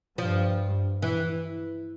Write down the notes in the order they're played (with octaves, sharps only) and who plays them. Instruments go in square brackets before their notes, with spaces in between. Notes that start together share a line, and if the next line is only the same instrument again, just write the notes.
[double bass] G2 [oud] F3
[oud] E3